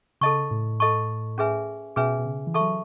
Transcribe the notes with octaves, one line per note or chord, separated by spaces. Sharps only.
C#3 A4 D#5 A5 C#6
A2
A4 D#5 A5 C#6
C#4 G#4 B4 E5 G#5
B2 C#4 G#4 B4 E5 G#5
B2
C#3
E3
A4 E5 A5 C#6
F#3